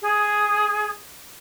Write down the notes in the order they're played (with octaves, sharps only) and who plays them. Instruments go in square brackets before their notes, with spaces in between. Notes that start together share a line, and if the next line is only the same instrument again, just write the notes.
[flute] G#4